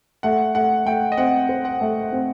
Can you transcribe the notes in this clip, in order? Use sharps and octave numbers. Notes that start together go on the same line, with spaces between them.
A3 F#5
A3 F#5
A3 G5
D#5
C4 F#5
C5
F#5
A3
C4